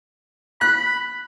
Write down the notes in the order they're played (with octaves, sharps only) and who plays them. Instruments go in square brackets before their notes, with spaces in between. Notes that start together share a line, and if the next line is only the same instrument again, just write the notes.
[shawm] B5 [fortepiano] F#6